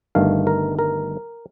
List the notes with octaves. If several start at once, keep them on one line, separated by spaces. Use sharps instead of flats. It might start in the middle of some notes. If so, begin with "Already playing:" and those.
G1 G2 D#3 A3 F5
A#4
A#4